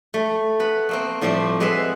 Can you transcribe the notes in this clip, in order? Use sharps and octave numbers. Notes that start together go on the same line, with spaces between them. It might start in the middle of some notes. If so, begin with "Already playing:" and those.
A3
B3 B4 B5
A3 A#3 C4
A2 F3 G3 A3 C4 G4
G#3 B3 C4 G#4 E5